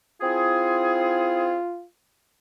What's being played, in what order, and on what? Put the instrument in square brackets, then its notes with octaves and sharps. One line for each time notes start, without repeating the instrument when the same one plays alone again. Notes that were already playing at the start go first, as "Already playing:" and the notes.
[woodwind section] C4 E4 G#4 [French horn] F4